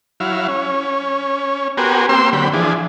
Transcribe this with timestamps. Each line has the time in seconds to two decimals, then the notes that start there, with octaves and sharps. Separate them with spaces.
0.20 F#3 E4 F5
0.48 C#4
1.77 B3 F#4 G4 A#4 C5 G#5
2.09 A#3 C4 G4 C5 C6 E6
2.33 D3 F#3 G5 B5
2.53 E3 F3 D4 G#4